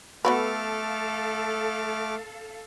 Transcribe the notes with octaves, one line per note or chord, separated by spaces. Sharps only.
A3 B3 F#4 A4 B4 F5 D6 F6